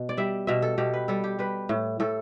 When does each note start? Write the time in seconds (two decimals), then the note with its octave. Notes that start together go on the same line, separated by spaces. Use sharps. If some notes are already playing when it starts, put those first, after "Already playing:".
Already playing: B2
0.09 D5
0.17 G3 E5
0.47 B2 E5
0.62 A4
0.78 B2 G4
0.94 B4
1.08 G3 A4
1.24 G4
1.39 G3 B4
1.69 A2
2.00 A2 A4